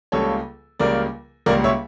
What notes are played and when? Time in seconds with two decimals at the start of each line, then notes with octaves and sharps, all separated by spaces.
0.12 C#2 C#3 G3 A#3 A4 C#5
0.79 C#2 C#3 G3 A#3 A#4 D5
1.46 C#2 C#3 G3 A#3 A#4 D5
1.64 C#5 E5